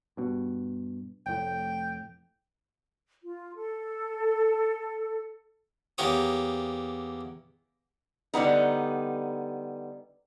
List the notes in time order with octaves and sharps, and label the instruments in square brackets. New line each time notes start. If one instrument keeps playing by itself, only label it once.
[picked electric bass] G2 B2
[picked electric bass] F1 A2 [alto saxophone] G5
[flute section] F4
A4
[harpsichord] E2 A#3 G4 C#5 D#6
[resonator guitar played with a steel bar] D3 G3 B3 D#4